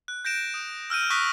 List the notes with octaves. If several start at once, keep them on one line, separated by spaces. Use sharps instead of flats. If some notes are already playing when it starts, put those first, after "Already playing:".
F#6
G6 A#6 D7 E7
D#6
E6 F6 G6 D#7
C#6 D#6 F#6 A#6 B6